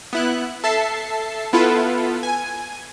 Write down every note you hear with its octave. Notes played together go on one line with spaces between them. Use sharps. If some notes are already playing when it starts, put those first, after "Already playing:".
B3 E4 F#6
A4 E5 A5 C7
B3 E4 F4 A4 B4
G#5